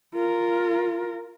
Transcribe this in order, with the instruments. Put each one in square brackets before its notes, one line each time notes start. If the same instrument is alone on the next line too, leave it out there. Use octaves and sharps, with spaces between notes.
[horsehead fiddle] F4 A#4